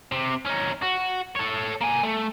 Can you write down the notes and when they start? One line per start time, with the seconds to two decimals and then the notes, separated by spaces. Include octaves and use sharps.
0.12 C3
0.45 C#4 D#4
0.82 F#4
1.35 A4 C#5
1.81 A#3 G#5
2.03 A3